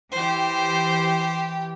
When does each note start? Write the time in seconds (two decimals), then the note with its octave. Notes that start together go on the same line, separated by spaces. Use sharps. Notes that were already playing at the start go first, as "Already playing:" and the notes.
0.12 E3 G4 C5